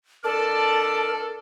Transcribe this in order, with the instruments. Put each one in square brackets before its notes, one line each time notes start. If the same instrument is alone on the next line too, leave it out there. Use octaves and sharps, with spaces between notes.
[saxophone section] F2 D4 D5 [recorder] A4 [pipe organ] A#4 [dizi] A5